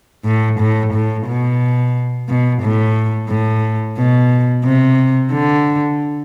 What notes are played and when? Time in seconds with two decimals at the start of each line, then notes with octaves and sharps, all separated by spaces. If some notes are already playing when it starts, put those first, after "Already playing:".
0.25 A2
0.59 A2
0.93 A2
1.27 B2
2.29 B2
2.62 A2
3.29 A2
3.97 B2
4.64 C3
5.32 D3